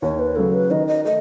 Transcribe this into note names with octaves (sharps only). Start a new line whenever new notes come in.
D#2 C#5
B4
C#3 F#3 A4
B4
D#3 D#5
D#5
A3 D#5